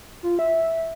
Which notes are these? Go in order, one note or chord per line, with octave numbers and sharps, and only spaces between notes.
F4
E5